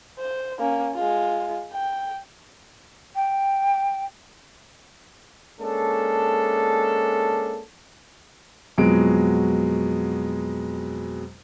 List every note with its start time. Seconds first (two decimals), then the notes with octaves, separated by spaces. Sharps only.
0.19 C5
0.59 A#3 C#4
0.95 G#3 F4
1.73 G5
3.15 G5
5.60 G#3 A#3 C#4 D4 A4
8.78 F2 B2 F#3 G#3 D7